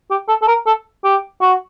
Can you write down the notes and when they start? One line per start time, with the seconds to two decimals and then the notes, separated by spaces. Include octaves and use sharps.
0.10 G4
0.28 A4
0.42 A4
0.48 A#4
0.66 A4
1.04 G4
1.41 F#4